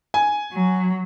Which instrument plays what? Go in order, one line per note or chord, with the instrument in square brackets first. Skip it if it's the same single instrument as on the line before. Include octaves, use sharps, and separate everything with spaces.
[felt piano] G#5
[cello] F#3